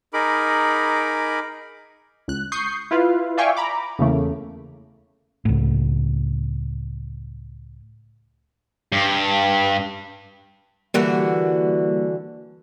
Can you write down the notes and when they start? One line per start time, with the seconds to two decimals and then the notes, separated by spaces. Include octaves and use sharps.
0.14 D#4 G#4 A#4 B5 D6
2.28 C#2 F#6
2.52 C#6 D#6 G6 C7
2.91 E4 F4 B4 F5
3.37 D5 E5 F5 G5 G#5 C#6
3.57 A#5 B5 D6
3.99 E2 C#3 A3 A#3
5.45 C#2 A2
8.92 G2
10.94 D3 E3 G3 A#3 F#4